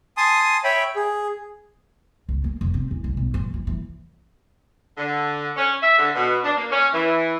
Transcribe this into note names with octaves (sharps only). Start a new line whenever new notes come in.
G#5 A5 C6 D#6
C#5 E5 G5 B5
G#4
C#2
A#3
F1
C4
E2
C2
B1
F3
E3
E3
D3
C#4
E5
D3
B2
D4
A#3
C#4
E3